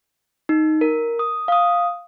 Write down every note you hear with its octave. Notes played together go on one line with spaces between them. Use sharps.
D#4
A#4
D#6
F5 D#6